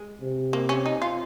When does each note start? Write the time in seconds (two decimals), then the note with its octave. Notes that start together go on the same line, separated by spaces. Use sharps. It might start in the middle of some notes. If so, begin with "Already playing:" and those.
Already playing: G#3
0.21 C3
0.53 A#3
0.69 C#4
0.86 D#4
1.02 F4